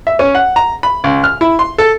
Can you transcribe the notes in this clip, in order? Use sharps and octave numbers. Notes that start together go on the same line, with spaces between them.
E5
C#4
F#5
A#5
B5
C#2
F6
E4
C6
A4